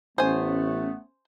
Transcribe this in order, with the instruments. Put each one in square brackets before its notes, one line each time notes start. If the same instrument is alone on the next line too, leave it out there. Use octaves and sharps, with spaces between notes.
[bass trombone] A1 [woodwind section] A3 B3 [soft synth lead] C#4 [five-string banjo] C5 G#5